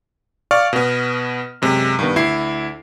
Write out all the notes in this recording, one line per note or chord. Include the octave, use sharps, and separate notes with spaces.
D5 F5 C#6 F6
B2 B3
F#2 C3 G#3
G2 D#3 B3
D2 E4 C7